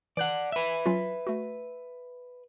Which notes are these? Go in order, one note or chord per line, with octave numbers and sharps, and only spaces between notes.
E3 D5 F#5 F#6
B4 E5
F#3 C#4 F4
A3 F#4